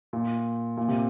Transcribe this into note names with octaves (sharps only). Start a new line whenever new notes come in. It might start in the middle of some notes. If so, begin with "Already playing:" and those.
A#2
A#2
C3